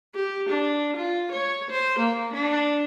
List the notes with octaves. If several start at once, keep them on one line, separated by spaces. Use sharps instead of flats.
G4
D4
F4
C#5
C5
A#3
D4